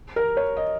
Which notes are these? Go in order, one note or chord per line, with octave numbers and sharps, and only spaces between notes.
A#4
C#5
D#5